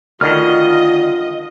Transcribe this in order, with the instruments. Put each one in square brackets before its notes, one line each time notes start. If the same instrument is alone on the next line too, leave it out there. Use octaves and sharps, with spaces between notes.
[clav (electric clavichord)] D2 D3 D#3 [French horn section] F4 [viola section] D#5 [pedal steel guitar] F6